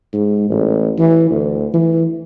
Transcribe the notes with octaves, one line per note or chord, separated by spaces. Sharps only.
G#2
A1
E3
D2
E3